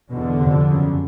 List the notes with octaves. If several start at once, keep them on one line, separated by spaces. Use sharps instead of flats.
E2 B2 D3
F2 C3
F#2 C#3